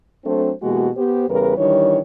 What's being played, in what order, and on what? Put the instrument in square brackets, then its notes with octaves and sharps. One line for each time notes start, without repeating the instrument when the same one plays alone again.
[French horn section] F#3 A3 C4 D4 A4 C5
B2 E3 G#3 A#3 F#4 G4
B3 G4 C5
E2 C#3 G3 A#4 B4
D#3 E3 G3 D4 C#5